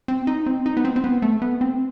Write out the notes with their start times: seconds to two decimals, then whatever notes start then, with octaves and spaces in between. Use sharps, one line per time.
0.08 C4
0.27 D#4
0.46 C4
0.66 D#4
0.77 B3
0.85 C4
0.96 C4
1.04 B3
1.22 A3
1.42 B3
1.61 C4